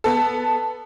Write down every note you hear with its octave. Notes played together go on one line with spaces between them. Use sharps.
B3 A4